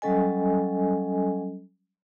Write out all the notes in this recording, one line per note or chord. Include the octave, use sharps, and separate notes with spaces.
F#3 G3 C#4 A4 D#5 G#5